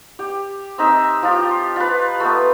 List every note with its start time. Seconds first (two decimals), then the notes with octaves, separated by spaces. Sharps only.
0.19 G4
0.78 C4 D#4 E5
1.22 F3 F4 G4
1.76 F4 B4
2.20 A3 B3